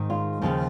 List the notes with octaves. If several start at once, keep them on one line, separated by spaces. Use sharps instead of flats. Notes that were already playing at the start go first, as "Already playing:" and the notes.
Already playing: G#2 D#3 G#3
F4
D#2 C#3 F3